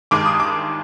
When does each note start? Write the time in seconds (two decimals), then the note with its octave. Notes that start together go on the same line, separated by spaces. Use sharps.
0.11 G2 D#3 G#3 D6
0.26 D#6
0.40 D6